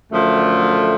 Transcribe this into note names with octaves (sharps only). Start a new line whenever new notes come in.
F#2 D3 F3 A3